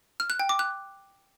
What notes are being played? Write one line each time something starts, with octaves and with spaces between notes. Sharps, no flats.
F6
F#6
G5
D6
F#6